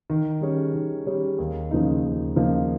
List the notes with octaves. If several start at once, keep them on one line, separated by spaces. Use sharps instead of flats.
D#3
G3 C#4 G#4 C#5
D#3
G3 C#4 G#4 C#5
D#2
C#3 F3 A#3 D#4
D#2
C#3 F3 A#3 D#4